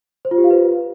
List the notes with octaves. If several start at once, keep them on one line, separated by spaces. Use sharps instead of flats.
C5
F4
G4
F5
B4